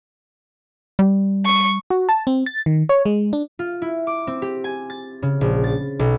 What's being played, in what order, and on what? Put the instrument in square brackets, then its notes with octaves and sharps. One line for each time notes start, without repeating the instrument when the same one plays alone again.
[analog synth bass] G3
[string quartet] C#6
[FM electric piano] F#4
A5
C4
A6
D#3
C#5
G#3
D4
[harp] F4
E4
D6
C4
G4
G#5
A6
C#3
A#1
A6
B1